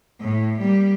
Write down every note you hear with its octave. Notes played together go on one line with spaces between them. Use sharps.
A2
G3 A#3